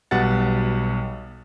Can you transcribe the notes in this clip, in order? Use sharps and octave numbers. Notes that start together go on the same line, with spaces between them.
B1 B2 G3 F#5 A6